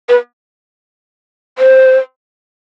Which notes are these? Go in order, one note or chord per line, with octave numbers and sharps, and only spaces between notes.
B4
C5